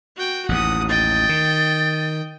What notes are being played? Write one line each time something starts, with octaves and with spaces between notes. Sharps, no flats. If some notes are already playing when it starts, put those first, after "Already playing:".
F#4 G5
A1 D#2 F#5 D#6
D#5 G5 A6
D#3